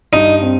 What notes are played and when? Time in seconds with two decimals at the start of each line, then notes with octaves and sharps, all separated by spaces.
0.13 G2 D#4
0.42 C4